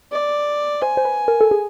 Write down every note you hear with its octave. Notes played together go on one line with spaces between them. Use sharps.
D5
C5 G#5
C5
B4
A#4
A4
G#4